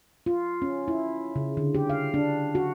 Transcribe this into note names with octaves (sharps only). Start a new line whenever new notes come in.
F4
C#4
E4
C#3
D3
G4
F5
D4
F#4